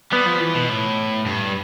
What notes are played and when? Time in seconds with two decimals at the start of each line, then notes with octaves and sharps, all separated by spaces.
0.12 G3 B3
0.27 F3
0.41 E3
0.55 B2
0.69 A2
1.26 G2